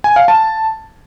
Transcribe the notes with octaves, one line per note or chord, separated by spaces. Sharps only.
G#5
F5
A5